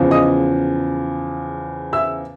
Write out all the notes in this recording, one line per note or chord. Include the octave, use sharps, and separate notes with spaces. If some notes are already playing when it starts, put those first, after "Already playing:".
Already playing: E2 C#3 F3
D#5 D#6
E5 E6